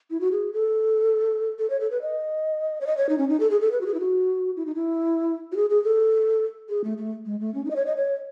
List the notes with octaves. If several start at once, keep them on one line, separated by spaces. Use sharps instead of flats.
E4
F#4
G#4
A4
A4
C#5
A4
B4
D#5
C#5
D#5
C#5
D#4
C#4
D#4
A4
G#4
A4
B4
F#4
G#4
E4
F#4
E4
D#4
E4
F#4
G#4
G#4
A4
G#4
A3
A3
G#3
A3
C#4
D#4
D#5
C#5
D#5
C#5